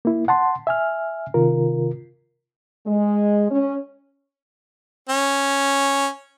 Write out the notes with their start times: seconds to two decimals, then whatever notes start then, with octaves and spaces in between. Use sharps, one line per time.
0.05 A#3 E4
0.28 F#5 A5 C6
0.67 E5 G#5 F6
1.34 C3 D#3 F4 A#4
2.87 G#3
3.51 C#4
5.09 C#4